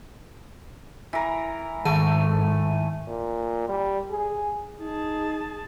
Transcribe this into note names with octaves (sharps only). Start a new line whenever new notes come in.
E3 A#4
G#2 D#3 A3 A5 D#7
A#2
G3
G#4
D#4 G#4 A5